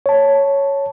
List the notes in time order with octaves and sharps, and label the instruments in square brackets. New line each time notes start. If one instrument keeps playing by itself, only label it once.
[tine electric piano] C#5 A5